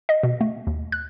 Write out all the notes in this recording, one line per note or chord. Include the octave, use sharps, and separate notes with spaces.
D#5
B2
A3
D#2
F#6